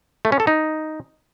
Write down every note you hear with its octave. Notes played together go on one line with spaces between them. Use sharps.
A3
C#4
A4
D#4